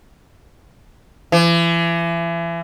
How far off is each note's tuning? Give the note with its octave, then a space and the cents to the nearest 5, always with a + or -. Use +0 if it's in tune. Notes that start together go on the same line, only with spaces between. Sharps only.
E3 +35